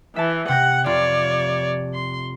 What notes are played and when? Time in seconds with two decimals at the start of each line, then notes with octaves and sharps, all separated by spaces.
0.16 E3 E5 A5
0.48 C3 F#5 G5 A#6
0.86 F1 F4 C#5 D5
1.94 C6